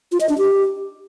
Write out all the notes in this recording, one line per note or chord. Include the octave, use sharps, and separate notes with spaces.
F4
D#5
D4
G4